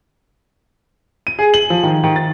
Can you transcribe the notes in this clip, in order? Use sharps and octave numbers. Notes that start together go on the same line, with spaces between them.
D#7
G#4
F#7
F3
D#3
D#3
A6